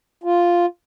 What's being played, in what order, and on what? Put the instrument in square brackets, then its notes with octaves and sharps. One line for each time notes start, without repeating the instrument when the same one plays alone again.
[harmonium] F4